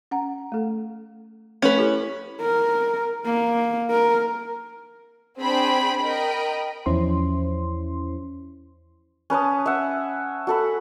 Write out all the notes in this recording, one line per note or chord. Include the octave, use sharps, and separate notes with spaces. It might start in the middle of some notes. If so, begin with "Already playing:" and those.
C#4 F#5 A#5
A3 A4
A3 C#4 B4
E4 G4 A4
A#4
A#3
A#4
C4 D4 G#4 C5 G5 B5
A#4 D#5 G5 B5
E2 F3 C#4 E4 C5 C6
C#4 B4 A5 D#6
E5 F#5
F#4 A4 B5